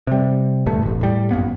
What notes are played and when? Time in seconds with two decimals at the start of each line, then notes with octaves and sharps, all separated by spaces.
0.07 C3 G3
0.66 D#1 D2 G2 A3
0.82 E1 A1
1.01 A2 G3
1.31 A1 F#2 A#3 B3